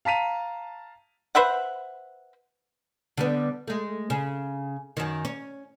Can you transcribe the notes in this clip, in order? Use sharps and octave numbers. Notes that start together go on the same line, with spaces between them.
F5 A5 A#5 B6 D#7 F7
B4 C5 E5 F#5
D3 G3 B3
G#3 A3
C#3
F#2 D#3
C#4